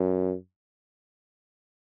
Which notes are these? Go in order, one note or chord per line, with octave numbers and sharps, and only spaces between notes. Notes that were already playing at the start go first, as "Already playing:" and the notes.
Already playing: F#2